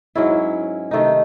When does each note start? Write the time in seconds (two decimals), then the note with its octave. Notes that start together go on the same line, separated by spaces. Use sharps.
0.15 G#2 F#3 C#4 E4
0.91 C3 D#3 A3 D#4